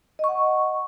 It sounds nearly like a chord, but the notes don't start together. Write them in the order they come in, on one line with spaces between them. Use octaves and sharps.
D#5 C#6 F#5